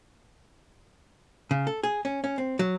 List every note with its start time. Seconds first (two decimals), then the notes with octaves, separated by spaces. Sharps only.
1.51 C#3
1.67 A4
1.83 G#4
2.05 C#4
2.24 C#4
2.38 C4
2.59 F#3